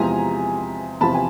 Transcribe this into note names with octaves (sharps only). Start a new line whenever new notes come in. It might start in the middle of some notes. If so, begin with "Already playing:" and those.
Already playing: E2 C3 F3 G#3 C4 G#5 A#5
E2 C3 F3 A5 B5
G#5